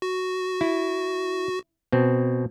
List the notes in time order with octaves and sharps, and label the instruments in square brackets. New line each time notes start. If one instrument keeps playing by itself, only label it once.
[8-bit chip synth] F#4
[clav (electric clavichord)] E4
B2 C4